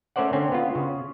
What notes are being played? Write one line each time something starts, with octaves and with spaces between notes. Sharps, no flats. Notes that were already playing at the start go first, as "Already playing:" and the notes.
A3 C#4 A#4 C5 D5 F#5
D3 C4 C#4
B3 F4
C#3